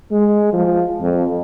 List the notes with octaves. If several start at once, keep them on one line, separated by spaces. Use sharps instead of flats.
G#3
F3
F2